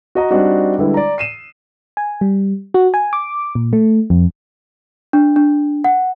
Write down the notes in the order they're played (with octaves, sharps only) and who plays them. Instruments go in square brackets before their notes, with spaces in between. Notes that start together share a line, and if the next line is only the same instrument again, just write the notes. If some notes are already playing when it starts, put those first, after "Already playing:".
[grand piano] F#4 D#5 A#5
G3 C4 D4 D#4 F#4
D3 G3 G#3 E4 B4
D5 A#5
C7 D#7 E7
[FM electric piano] G#5
G3
F#4
G#5
D6
A#2
A3
F2
[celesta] D4
D4
F#5